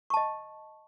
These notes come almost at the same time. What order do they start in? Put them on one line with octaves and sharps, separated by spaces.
C#6 A5 D#5